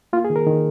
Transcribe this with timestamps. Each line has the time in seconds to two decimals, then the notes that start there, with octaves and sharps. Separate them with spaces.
0.13 A#3 F4
0.25 G#4
0.30 D#3
0.36 A#4
0.47 D#3